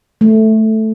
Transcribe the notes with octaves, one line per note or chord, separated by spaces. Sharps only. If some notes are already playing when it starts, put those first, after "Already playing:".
A3